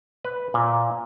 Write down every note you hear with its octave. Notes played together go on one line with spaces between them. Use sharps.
B4
A#2